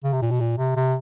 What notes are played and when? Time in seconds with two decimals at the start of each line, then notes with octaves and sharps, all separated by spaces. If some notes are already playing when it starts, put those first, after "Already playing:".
0.04 C#3
0.13 C3
0.22 A#2
0.31 B2
0.40 A#2
0.58 C3
0.76 C3